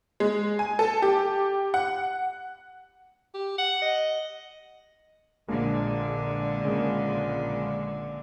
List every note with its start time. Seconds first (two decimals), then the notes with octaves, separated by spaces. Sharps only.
0.20 G#3
0.59 G#5
0.79 A4
1.02 G4
1.74 F#5
3.34 G4
3.58 F#5
3.82 D#5
5.48 A#1 A#2 D3 G#3 A#3 D4
6.65 C#3 G#3 A#3